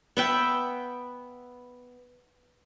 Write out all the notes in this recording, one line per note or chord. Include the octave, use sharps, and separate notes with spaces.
B3 E5 G5